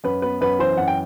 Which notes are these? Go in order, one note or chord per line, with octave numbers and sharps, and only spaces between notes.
F#2 B4
B3 B4
F#2 B4
E3 C5
F#2 F#5
G5